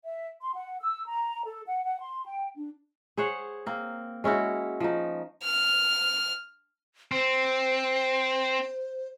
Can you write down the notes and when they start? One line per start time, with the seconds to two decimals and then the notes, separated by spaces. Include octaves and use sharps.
0.04 E5
0.41 C6
0.55 F#5
0.81 E6
1.08 A#5
1.46 A4
1.66 F#5
1.84 F#5
2.00 C6
2.25 G5
2.57 D4
3.17 G#4 C5 C#5 F#5
3.66 A#3 C4
4.24 G#3 C#4 E4 F#4
4.80 F3 D#4
5.43 F6
7.12 C4 C5